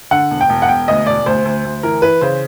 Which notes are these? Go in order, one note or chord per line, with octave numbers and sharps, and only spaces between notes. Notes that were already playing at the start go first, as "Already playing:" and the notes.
D3 F#5
E1
G5
E1
F#5
E1 G5
D2 D#5
E1 D5
D2 C5
D2
D2
E3 A#4
E3 B4
C#3 C5